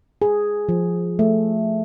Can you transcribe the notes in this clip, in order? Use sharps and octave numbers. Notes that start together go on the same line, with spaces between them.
G#4
F3
A3